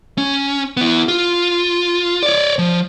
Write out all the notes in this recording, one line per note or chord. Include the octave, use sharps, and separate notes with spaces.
C#4
B3 E4
F4
C#5 D5
F3